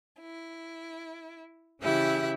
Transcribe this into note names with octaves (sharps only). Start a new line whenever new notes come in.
E4
C#3 E3 E4 G4 E5 F#6